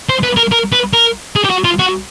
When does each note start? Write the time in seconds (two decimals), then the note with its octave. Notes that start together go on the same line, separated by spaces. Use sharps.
0.09 C5
0.23 B4
0.37 A#4
0.52 A#4
0.72 B4
0.93 A#4
1.36 G#4
1.44 G4
1.50 F#4
1.64 F4
1.79 F#4